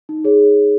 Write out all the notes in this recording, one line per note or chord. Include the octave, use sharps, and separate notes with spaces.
D#4
G#4 C#5